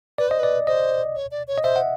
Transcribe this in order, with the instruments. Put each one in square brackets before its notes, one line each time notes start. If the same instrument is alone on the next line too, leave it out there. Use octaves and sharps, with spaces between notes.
[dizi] B4 [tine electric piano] D5
[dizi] C5 [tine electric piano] D#5
[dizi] B4 [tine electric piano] D5
[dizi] C5 [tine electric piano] D#5
[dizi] C#5
D5
C#5
[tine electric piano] D#5
[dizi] C5 [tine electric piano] E5
[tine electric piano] F#5